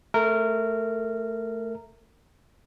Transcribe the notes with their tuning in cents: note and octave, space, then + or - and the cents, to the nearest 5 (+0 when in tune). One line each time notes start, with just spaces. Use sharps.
A3 +0 A#4 -15